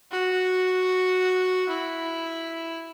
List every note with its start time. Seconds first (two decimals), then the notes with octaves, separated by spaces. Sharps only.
0.11 F#4
1.68 E4